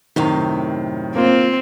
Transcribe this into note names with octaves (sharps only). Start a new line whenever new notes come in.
F#2 A2 C3 D#3
A#3 C4 F4